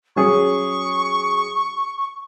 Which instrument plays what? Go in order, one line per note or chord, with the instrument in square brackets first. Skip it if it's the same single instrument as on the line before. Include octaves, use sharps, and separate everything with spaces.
[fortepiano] F#3 C#4 G#4 [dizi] C#6